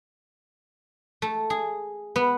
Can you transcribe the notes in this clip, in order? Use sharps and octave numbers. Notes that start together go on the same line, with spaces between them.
A3
G#4
B3